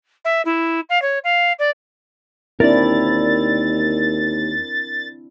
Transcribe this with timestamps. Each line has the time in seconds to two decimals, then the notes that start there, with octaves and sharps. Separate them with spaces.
0.25 E5
0.45 E4
0.90 F5
1.02 C#5
1.24 F5
1.59 D5
2.60 D#2 C4 D4 E4 A#4 D5 A6